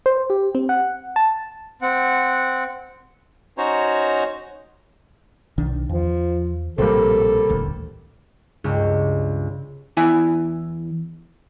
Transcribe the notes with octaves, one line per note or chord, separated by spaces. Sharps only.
C5
G4
C4
F#5
A5
C4 F#5
C#4 D#4 F#4 C5 C#5 A#5
B1 D#3 D4
E2 F3
A#1 A2 C3 G3 A#3 C4 A4
D#1 A1 D2
C#2 G2 C#3 G#3
E2 E4 G#5